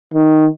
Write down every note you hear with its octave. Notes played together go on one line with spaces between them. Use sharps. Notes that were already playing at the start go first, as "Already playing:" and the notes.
D#3